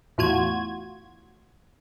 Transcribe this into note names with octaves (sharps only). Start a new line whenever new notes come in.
E2 A2 F4 F#4 G#6